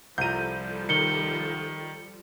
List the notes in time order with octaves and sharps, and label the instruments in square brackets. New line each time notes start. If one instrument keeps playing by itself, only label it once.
[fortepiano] C2 A#5 [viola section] F3 G3 A4 [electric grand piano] G6 D#7
[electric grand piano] D#3 [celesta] C#7 G7